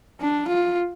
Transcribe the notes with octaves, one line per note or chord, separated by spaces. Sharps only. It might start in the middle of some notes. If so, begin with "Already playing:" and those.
D4
F4